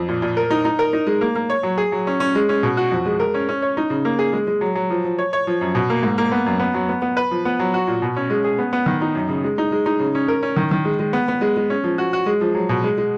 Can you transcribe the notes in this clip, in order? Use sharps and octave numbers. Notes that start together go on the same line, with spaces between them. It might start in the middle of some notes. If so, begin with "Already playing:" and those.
Already playing: F2
A#2
A#2
A#4
D#4
D#4
A#4
D#4
G#3
A#3
A#3
C#5
F#3
G#4
F#3
C#4
C#4
G#3
C#4
B2
F#4
F2
G#3
A#4
C#4
C#4
C#5
D#4
C#3
A#3
G#4
G#3
G#3
F#3
F#3
F3
F3
C#5
C#5
F3
F#2
B2
A#3
G#2
A#3
B3
F#2
B3
F#3
B3
B3
B4
F3
B3
F#3
F#4
A#2
B2
C#4
G#3
G#4
B3
B3
D#3
D#4
F#2
C#3
G#3
D#4
G#3
D#4
C#3
C#4
A#4
C#4
D#3
D#3
G#3
G#3
B3
B3
G#3
G#3
C#4
F3
F#4
F#4
G#3
F3
F#3
B2
G#3
G#3